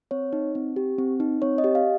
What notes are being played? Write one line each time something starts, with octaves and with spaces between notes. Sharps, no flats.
C4 C#5
D#4
C4
G4
C4
D#4
C4 C#5
D#5
G4
F5